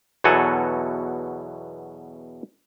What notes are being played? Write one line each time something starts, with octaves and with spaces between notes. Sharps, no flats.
E2 B2 F#3 A4 F#5 G#5